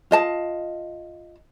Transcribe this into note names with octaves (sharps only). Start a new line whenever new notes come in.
F4 D#5 A5